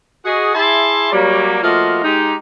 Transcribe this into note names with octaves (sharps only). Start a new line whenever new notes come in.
F#4 G#4 D#5
E4 G#4 E5 A5 C6
F#3 G3 A#3
F3 A3 A#3 F4 F#4 D#5
G#3 D#4 G4